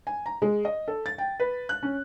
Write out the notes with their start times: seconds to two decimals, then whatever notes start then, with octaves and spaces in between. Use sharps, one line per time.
0.07 G#5
0.26 A#5
0.42 G#3
0.65 D#5
0.88 A4
1.06 A6
1.18 G5
1.40 B4
1.69 F#6
1.83 C#4